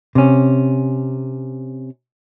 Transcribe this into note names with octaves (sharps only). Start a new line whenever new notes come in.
C3 C#4